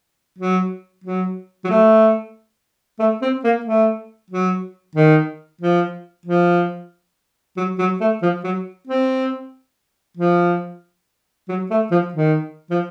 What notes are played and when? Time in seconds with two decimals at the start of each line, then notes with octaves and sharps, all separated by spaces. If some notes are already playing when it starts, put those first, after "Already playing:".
0.38 F#3
1.04 F#3
1.64 F#3
1.70 A3
2.99 A3
3.22 C4
3.44 A#3
3.66 A3
4.30 F#3
4.95 D#3
5.61 F3
6.26 F3
7.57 F#3
7.79 F#3
8.01 A3
8.22 F3
8.44 F#3
8.87 C4
10.17 F3
11.49 F#3
11.70 A3
11.91 F3
12.14 D#3
12.70 F3